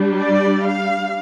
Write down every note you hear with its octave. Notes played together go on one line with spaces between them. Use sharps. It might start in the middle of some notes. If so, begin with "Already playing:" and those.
Already playing: G3 D4
D5
F5